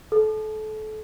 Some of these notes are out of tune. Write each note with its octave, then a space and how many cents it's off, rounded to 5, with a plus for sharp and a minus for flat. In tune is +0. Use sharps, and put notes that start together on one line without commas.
A4 -30